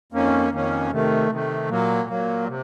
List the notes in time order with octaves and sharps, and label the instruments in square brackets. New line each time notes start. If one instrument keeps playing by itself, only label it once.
[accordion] F2 D#3 A#3 C#4
F2 D#3 A#3 C#4
C3 D#3 A3
C3 D#3 A3
A#2 F#3 A#3
A#2 F#3 A#3
C3